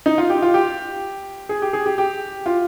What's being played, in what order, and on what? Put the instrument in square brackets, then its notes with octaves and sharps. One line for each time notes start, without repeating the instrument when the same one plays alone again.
[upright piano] D#4
F4
G4
F4
G4
G#4
G4
G#4
G4
G4
F4